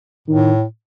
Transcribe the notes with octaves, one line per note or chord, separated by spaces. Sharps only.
A2 D#3